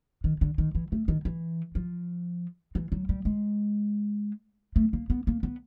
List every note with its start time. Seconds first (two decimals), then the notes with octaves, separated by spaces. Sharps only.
0.24 D#3
0.41 D3
0.58 D#3
0.75 E3
0.92 A3
1.08 D#3
1.25 E3
1.75 F3
2.75 E3
2.92 F#3
3.09 G3
3.25 G#3
4.76 A3
4.93 A#3
5.10 B3
5.27 A#3
5.43 B3